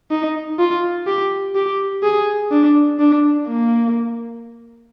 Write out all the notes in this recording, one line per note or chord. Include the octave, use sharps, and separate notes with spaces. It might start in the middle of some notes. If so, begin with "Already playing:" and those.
D#4
F4
G4
G4
G#4
D4
D4
A#3